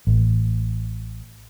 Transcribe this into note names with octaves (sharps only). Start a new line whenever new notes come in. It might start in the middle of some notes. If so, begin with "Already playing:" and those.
A1